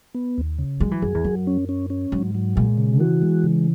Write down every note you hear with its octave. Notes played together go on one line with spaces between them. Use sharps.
B3
D#2
C#3
F#3 G#3
E3
F#2 G#4
E2
F#2 F#3
C#4
C#4
C#4
G#2 F#3
F#3
A#2 G#3
C#3
E3 F#4
G#3
C#3